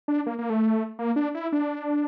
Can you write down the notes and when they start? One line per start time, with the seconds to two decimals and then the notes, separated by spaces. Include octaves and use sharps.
0.08 D4
0.26 A#3
0.39 A#3
0.50 A3
0.99 A#3
1.16 D4
1.35 E4
1.52 D4